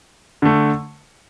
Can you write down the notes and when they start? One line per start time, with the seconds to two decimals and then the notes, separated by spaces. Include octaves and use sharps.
0.42 D3 A3